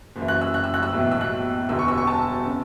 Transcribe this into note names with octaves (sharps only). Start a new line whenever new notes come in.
F#1 F#2 E3
F#6
E6
F#6
E6
F#6
E6
B1 A2 E3
E6
F#6
E1 E2 D3 E6
C#6
E6
C#6
A5
C#3